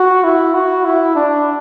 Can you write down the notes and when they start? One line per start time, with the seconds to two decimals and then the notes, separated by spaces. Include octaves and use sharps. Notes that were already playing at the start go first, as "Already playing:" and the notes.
Already playing: F#4
0.24 E4
0.54 F#4
0.85 E4
1.15 D4